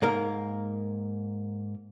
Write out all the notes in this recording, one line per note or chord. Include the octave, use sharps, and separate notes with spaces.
G#2 A#3 A#4